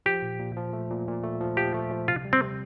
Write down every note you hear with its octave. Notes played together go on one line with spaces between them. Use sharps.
F3 G4
A#2
A#2
F3
A3
A#2
A#2
A3
F3
F3 G4
A3
F3
C3 F4
G3
C4
C3